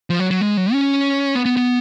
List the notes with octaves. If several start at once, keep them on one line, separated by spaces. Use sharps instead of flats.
F3
F#3
F#3
G#3
F#3
C#4
B3
B3
B3